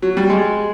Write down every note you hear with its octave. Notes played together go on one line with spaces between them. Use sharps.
F#3
G3
G#3